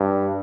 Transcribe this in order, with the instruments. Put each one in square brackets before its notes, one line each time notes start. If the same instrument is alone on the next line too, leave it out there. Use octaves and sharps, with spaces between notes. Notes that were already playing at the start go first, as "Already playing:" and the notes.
Already playing: [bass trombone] G2